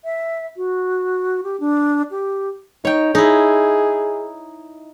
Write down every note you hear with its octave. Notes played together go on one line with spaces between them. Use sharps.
E5
F#4
G4
D4
G4
D#4 C#5 G5
D#4 E4 G#4